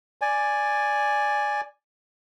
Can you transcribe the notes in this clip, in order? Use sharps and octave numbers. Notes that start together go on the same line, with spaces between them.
D5 G#5